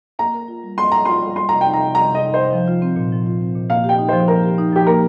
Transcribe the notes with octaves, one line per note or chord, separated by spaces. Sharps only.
A#3 A#5
A#4
F4
G3
A#3 C6
A#4 A#5
F4 C6
G3
G3 C6
C3 A#5
G5
D#4
A#5
C3
G3 A#5
C3
D#5
D#4
C3 C5
F3
F4
C4
A#2
F3
F4
C4
A#2
A#3 F5
G4
G5
D#4
F3 C5
A#3 A#4
G4
D#4
F3 G4
A#3 A#4